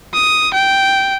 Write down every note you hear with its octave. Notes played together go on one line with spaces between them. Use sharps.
D#6
G5